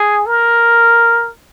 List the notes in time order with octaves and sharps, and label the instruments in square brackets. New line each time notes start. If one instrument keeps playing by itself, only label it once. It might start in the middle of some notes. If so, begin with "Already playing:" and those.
Already playing: [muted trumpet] G#4
A#4